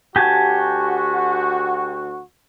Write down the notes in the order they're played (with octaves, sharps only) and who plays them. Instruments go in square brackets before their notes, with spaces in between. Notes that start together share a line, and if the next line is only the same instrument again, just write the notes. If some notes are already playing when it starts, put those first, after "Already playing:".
[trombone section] D2 F#4 [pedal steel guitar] G4 G#5 A5